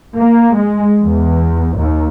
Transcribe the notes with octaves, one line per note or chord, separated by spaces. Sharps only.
A#3
G#3
E2
D#2